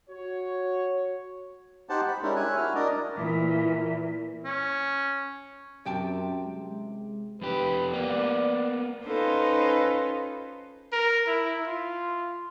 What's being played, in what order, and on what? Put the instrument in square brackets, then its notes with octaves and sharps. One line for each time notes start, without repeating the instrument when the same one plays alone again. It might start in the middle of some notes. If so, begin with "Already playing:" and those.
[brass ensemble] F#4 C#5
[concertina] D#4 G4 C5 F#5 A5
B5
G#3 C#4 D4 E4 G4 A#4
C#5 E5 G#5 F#6
E4 F#4 F6
D4 A#4 D5 D#5
[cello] A#2 E3
[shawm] C#4
[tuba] F#2 [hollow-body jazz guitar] C3 G5 A5
[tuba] G#3
[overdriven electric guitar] F2 G4 [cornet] B4
[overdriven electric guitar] A#3 B3 [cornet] D5
[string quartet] C#4 D#4 F4 A4 B4 C5
[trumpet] A#4
E4
F4